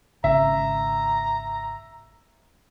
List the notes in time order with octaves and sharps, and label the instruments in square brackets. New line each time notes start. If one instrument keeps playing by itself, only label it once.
[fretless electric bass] G#1 C#3 [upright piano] E5 [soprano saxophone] A#5